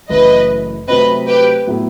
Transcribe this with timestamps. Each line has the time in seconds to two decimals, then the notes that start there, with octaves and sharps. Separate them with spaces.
0.10 F#1 F#2 E3 A3 E4 B4 D#5
0.88 C3 F#3 A3 C4 B4 D#5
1.27 G4 B4
1.67 A2 F#3 B3 E4 A4